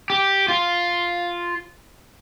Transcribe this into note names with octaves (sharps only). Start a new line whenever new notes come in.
G4
F4